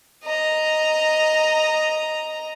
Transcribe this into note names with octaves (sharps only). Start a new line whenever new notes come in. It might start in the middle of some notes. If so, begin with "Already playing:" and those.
D#5 A#5